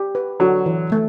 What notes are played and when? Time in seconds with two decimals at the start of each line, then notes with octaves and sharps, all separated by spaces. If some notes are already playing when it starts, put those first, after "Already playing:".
Already playing: G4
0.15 B4
0.40 D3 F#3 F#4
0.66 E3
0.92 A3